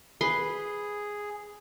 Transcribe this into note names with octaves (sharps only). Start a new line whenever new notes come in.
G#4 B4 C6